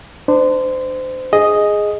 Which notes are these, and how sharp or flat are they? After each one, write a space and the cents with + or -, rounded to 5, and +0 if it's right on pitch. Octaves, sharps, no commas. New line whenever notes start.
D4 +25 C5 -25
G#4 +0 D#5 +0